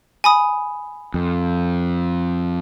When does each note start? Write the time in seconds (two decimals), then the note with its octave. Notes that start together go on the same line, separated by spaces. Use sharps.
0.24 G#5 B5 D#6
1.14 F2